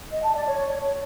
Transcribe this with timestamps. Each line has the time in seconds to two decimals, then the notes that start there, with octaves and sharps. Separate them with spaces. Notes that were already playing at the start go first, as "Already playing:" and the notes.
0.11 D#5
0.23 A5
0.35 D5
0.46 C#5